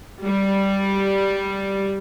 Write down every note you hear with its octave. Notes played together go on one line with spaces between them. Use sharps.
G3